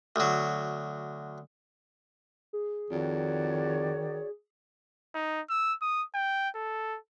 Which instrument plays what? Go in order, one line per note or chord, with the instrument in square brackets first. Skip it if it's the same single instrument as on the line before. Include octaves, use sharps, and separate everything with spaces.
[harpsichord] D2 F#3
[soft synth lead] G#4
[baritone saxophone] F2 [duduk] D#3 [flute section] F#4 C#5 D5
[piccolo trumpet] D#4
E6
D#6
G5
A4